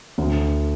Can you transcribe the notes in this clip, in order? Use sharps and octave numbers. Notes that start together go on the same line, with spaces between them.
D2